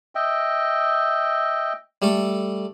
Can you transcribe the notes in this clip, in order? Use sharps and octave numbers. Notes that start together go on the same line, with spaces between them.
D#5 E5 G5
G3 A3 A4